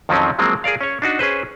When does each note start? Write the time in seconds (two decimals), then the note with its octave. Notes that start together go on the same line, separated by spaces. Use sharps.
0.09 F2 D#3 F3 F#3 C4 C#4
0.39 F3 F#3 G#3 A#3 C4
0.64 G#4 A#4 D5 F5
0.81 C#4 C#5
1.02 D4 D#4 F#4
1.19 C#4 G#4 B4 C5